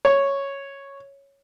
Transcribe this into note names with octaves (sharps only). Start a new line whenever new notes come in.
C#5